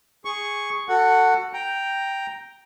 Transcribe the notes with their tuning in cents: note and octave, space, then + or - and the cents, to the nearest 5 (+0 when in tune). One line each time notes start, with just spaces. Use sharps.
G#4 -5 C#6 +0
F#4 +0 A4 +25 F#5 +0
G5 +0 A#5 +0